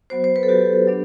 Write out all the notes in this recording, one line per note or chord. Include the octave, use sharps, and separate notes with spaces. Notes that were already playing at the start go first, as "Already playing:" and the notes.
F#3 B3 F#4 C5
C5
B4
A4
F#3 B3 F#4 G4
F#3 B3 D4